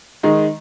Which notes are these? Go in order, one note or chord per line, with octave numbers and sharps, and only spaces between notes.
D#3 G#3 D#4